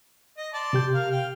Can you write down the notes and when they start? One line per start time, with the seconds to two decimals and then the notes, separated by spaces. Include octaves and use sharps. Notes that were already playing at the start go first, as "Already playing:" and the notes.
0.37 D#5
0.54 D5 A5 C6
0.73 C3 G4 G6
0.94 A#4 F5
1.11 F5 G5